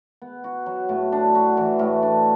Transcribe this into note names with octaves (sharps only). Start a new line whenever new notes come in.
B3
F#4
F#3
A2
D4
F#4
E3
A2
D4